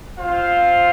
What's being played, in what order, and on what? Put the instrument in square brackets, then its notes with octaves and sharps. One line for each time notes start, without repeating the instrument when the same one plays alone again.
[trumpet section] C4 F4 C5 F5